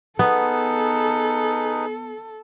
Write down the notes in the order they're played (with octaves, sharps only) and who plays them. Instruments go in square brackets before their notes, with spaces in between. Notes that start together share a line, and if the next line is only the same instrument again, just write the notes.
[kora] B3 [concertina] D#4 G#4 B4 [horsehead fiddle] A4